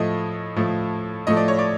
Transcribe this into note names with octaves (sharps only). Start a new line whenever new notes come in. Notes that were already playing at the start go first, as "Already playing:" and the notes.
Already playing: A2 F3 A3 D#5
A2 F3 A3
A2 F3 A3 D#5
D5
C#5
D5